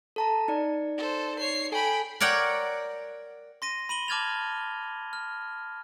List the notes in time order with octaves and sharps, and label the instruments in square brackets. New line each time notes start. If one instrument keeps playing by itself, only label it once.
[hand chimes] A4 A5 A#5
D#4 D5
[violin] A4 C5
C#5 C7
[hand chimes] A4 G#5 [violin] G5 B5
[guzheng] A#4 C#5 D5 F#5 G5
[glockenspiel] C6 A#6 D#7
B5 D#7 F#7 G7
A5 D6 F6 G#6 A6 F7
F6